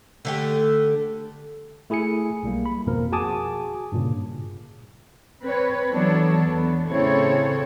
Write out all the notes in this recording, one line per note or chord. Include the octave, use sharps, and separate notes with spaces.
D3 A3 G4
A3 E4 G#4 G#5 C#7
B1 G3 A#3
B5
G#1 F2 B2 F3 A#3 A#4
F#4 G#4 G#5 A5 D6 D#6
G2 A#2 C#3
C4 B4 C#5
E3 F#3 B3 D4 A4 C#5
E2 B3
A2 C#3 C4 E4 A4 C#5